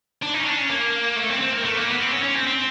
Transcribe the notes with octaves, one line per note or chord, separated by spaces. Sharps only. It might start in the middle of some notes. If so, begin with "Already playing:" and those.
D4
D#4
C#4
D4
C#4
A#3
A3
C4
C4
A#3
A3
A#3
B3
C4
C#4
C#4
C4
C4